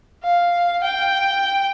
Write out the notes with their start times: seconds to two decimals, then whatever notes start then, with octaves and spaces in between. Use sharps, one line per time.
0.23 F5
0.83 G5